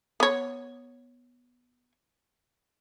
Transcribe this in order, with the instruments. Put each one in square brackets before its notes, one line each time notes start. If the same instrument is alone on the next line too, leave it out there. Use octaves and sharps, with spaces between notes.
[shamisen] B3 C#5